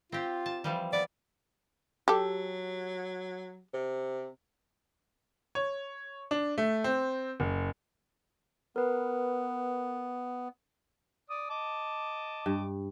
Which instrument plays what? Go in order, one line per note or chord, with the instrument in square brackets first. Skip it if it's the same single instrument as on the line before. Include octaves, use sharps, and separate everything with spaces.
[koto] C4 G4 [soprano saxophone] F4
[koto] A5
E3 F3 G3
[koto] B3 [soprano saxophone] D5
[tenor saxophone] F#3 [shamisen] G4 A4
[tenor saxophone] C3
[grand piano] C#5
D4
A3
C4
F#1
[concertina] B3 [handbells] A#4 B4
[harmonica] D5 D#6
D#5 A5 D6
[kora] G2